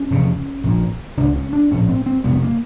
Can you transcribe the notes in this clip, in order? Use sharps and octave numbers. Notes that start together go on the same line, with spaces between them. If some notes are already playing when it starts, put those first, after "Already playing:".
Already playing: C#4
F1 E2 C#3
A#1 A#2
C#2 C#3 D4
C#4
D4
A#1 A2 C#4
C4
C4
F1 F2 C3 B3
A#3